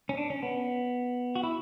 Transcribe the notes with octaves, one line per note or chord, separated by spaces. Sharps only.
C#4
D4
C#4
B3
F#4
E4